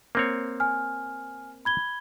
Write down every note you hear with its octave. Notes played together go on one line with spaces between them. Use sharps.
A#3 C4 C#5
G#5 F6
B5 G#6 G7